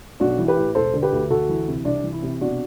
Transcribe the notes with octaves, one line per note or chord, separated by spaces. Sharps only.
B1 D4 F#4
E3
G4 B4
A2
E1 A4 C5
D3
G4 B4
D2
D2 F#4 A4
E3
C3
C2 D4
E3
E4
C3
B2 D4 F#4